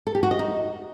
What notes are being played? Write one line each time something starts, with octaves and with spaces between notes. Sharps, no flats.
A4
G4
F#4
D#5
D#4